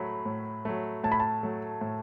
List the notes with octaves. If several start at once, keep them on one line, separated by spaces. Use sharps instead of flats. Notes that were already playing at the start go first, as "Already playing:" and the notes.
Already playing: A2 F#3 A3 B5
A2
F#3 A3
A2 A5
B5
A5
F#3 A3
A2